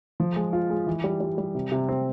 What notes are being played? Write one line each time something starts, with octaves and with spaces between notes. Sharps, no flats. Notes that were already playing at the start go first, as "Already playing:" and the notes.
F3
G#3
F4
G#3
E3
G3
G3
G3
C3
C3
C4